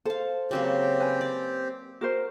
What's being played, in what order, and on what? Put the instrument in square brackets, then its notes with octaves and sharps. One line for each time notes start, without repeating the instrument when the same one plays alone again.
[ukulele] A4 [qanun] C5 F5
[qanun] C#3 F#3 A#3 [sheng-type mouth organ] C4 G4
[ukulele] B4 G#5
[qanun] D5
[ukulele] F#4 A#4 C5